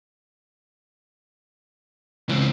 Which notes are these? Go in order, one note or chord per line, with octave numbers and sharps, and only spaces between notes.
C#2 E3 C4